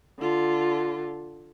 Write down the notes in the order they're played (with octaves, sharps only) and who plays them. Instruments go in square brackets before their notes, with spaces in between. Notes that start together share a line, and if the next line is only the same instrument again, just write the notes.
[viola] D3 F4